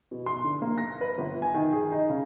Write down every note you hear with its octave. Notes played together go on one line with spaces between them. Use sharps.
B2
C6
D3
A#3
A#6
B4
G1
G#5
D#3
G#4
D#4
C#3